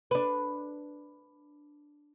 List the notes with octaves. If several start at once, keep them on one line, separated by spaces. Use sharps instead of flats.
D4 B4